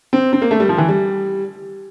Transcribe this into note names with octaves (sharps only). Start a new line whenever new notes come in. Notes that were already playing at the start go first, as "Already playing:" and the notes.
C4
C4
A#3
A3
G3
F3
E3
G3